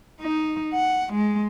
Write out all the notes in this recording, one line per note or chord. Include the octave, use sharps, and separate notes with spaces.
D#4
F#5
G#3